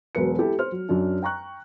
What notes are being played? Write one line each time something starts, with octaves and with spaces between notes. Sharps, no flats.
E1 F#3 A#4 B4 C#7
E4 G4 A4
C5 F6
F#3
F#2 F#3 D4
G5 A#5 C#6 F#6